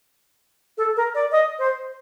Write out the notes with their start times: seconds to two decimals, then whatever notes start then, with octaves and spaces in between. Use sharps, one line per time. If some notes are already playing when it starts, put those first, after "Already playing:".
0.78 A4
0.97 A#4
1.15 D5
1.32 D#5
1.59 C5